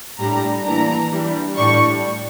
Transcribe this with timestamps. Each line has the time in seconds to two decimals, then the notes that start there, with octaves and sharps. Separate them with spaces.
0.18 A2 G3 D4 A#5
0.65 E3 A#3 D4 A#5
1.11 E3 G3 D4
1.56 A2 G3 D4 C#6